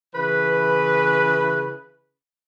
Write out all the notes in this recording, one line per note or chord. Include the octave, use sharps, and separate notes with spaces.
C#3 E3 B4